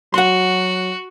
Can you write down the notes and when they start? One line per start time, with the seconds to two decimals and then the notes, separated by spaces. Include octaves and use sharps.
0.14 F#3 F#4 F#5 C6